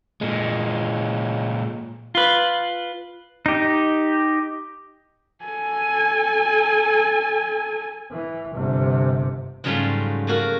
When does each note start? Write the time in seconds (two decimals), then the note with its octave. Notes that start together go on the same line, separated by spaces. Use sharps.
0.21 A#2 G#3
2.15 F4 B4
3.46 D#4 G4
5.44 A4 G#5
8.11 E3
8.55 G1 C3
9.64 G#2 C#3 F#3 G3 A3 F4
10.27 A3 A#3 F#4 A#4